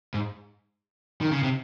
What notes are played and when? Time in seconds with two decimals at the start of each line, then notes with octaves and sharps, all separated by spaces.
0.14 G#2
1.21 D#3
1.32 C#3
1.43 C3